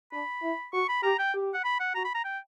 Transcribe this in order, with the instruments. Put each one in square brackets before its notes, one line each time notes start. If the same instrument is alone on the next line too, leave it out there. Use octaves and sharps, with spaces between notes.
[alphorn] D4 [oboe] B5
[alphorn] E4
[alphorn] F#4 [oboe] C#6
[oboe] B5
[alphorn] G4 [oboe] A#5
[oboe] G5
[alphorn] G4
[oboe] F#5
B5
F#5
[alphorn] F#4 [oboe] A#5
[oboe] B5
A#5
G5